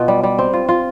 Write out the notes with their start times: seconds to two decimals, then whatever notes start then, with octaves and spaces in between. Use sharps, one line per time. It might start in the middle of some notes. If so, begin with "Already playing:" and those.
Already playing: B2 F4
0.08 G3
0.23 G3
0.39 C4
0.53 F4
0.69 F4